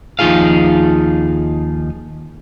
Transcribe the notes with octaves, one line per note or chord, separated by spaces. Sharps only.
D#2 F3 D#4 F4 G#4 F5